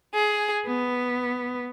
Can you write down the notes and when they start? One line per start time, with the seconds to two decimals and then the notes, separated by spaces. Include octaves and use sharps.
0.15 G#4
0.67 B3